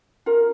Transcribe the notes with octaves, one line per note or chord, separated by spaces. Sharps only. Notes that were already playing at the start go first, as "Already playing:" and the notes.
F4 A#4